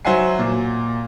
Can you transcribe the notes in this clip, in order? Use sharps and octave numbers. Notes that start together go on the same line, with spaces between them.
F#3 C5 E5 F#5 G#5 C7
A#2